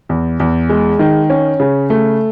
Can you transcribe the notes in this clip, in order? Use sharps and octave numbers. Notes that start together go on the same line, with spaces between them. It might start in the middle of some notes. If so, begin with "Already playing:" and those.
E2
E2
G#3
D#3
C#4
C#3
A3